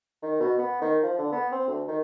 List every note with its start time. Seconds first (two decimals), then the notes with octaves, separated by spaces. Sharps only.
0.23 D#3
0.40 B2
0.59 B3
0.82 D#3
1.03 F3
1.18 D3
1.32 B3
1.52 C4
1.68 D2
1.88 D#3